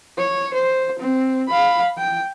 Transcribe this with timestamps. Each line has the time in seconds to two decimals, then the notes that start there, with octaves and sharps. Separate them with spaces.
0.18 C#5
0.54 C5
0.99 C4
1.48 F5 B5
1.98 G5